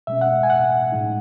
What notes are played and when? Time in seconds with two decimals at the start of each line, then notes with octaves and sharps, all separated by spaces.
0.07 B2 G#3 C#4 E5
0.21 F#5
0.43 G#5
0.50 F#5
0.92 A2 G#3 D#4